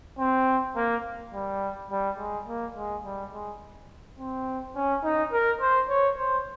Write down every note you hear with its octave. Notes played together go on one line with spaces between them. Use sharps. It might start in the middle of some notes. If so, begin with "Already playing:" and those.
C4
A#3
G3
G3
G#3
A#3
G#3
G3
G#3
C4
C#4
D#4
A#4
C5
C#5
C5